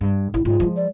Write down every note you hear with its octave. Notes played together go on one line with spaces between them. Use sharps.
G2
A1 E4
G#2 F#3 F4
F3 G#3
D5